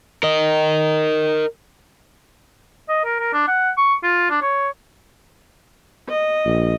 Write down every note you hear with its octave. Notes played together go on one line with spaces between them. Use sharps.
A#4 D#5
D#5
A#4
A#4
D4
F#5
C#6
F4
D4
C#5
D#5
A#1